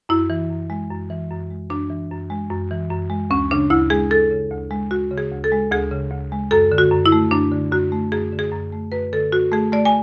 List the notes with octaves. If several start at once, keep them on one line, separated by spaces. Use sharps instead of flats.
F#2 E4
E3
F#2
G#3
F#2
E3
F#2
G#3
F#2 D4
E3
F#2
G#3
F#2
E3
F#2
G#3
D2 C#4
C#3 D4
D2 E4
G#3 G#4
D2 A4
C#3
D2
G#3
D2 F#4
C#3
G#4
D2
A4
G#3
D2 G#4
C#3
D2
G#3
F#2 A4
D3
F#4
F#2
E4
A3
F#2 D4
D3
F#2 F#4
A3
F#2 G#4
D3
G#4
F#2
A3
F#2 B4
D3 A4
F#2 F#4
A3 G#4
A3 D5
G#5